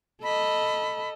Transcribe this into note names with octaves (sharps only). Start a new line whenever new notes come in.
A4 D#5 B5